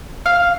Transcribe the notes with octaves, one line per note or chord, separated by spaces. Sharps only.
F5